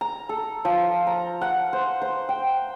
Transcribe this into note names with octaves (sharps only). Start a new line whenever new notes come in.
A#5
A4
F3
A#5
F#5
C5
C5
G5